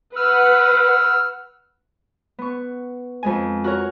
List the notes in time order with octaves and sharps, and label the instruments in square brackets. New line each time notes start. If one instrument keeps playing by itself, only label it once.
[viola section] B4 F#5 [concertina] E6 F6
[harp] B3 C#6
F2 G#3 G#5
F#4 A#4 C#5